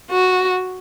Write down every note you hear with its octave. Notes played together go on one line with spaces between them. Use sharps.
F#4